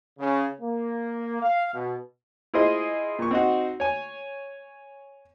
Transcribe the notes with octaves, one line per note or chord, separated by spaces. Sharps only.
C#3
A#3
F5
B2
E4 F4 G#4 C5 D#5
A#2 C#6
C4 D#4 F#4
C#5 G#5